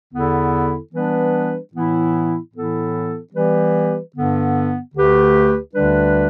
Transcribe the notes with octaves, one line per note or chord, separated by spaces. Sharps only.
E2 D3 B3 E4 A4
E3 G3 B3 D4 B4
A2 E3 B3 E4
A2 E3 B3 E4 A4
E3 G3 B3 G4 B4
G2 D3 B3
D2 D3 A3 G4 B4
D2 D3 G3 D4 B4